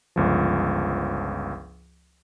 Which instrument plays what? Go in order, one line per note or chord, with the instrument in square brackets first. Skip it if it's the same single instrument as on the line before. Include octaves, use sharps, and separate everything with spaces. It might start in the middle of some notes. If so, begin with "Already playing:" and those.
[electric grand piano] G1 C#2 F3